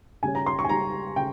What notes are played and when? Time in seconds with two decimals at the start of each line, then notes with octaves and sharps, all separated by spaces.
0.23 C#3 G3 C#4 G#5
0.35 A#5
0.46 C6
0.59 C#6
0.64 G#5
0.69 C#3 G3 C#4 A#5
1.16 C#3 G5